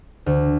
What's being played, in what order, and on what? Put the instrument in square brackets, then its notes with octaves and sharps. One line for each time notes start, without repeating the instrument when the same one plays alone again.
[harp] D2